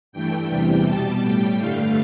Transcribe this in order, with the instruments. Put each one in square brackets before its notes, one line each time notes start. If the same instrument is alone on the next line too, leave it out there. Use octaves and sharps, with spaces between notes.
[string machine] G2 E3 A3 G5
E2 C3 E3 G3
B2 G3 A5
A2 G3 G5
G2 D3 A3 F5